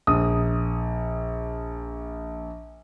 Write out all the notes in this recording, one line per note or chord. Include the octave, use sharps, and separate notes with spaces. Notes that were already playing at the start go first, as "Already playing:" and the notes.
A#1 D#6